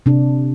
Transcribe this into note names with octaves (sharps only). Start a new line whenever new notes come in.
C3 D4